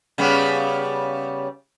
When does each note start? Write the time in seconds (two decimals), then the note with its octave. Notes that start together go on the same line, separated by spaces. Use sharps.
0.18 C#3 G3 B3